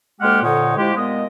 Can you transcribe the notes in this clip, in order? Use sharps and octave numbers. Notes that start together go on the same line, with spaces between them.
D2 G#3 A#3 G4 F#5 F6
F2 A#2 D3 D#4 C#5 F#5
F3 G#3 E4 G4
A#2 G#3 B3 D#5